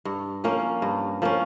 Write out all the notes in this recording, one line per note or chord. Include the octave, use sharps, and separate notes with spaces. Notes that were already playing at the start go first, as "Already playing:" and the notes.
G2
F3 A#3 C#4
G2
F3 A#3 C#4